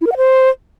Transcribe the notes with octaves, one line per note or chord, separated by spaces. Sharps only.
E4
A#4
F#5
C5